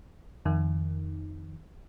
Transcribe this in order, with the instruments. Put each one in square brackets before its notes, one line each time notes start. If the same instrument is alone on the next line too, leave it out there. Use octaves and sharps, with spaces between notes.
[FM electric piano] F2 D#3